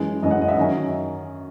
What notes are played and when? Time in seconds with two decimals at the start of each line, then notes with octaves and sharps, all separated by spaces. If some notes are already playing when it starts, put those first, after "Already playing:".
Already playing: F#2 E3 G#3 C#4
0.23 F#2 E3 G#3 C#4 D#5
0.31 F#5
0.42 D#5
0.48 E5
0.57 F#2 D#3 F#3 C#4 D#5